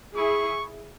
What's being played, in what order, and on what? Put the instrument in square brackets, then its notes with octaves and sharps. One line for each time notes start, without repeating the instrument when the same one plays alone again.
[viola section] E4 G#4 [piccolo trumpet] C#6